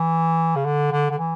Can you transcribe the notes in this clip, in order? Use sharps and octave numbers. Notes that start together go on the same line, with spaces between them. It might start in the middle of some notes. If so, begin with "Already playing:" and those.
Already playing: E3
C#3
D3
D3
D3
E3